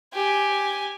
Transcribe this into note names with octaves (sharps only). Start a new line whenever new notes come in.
G4 G#5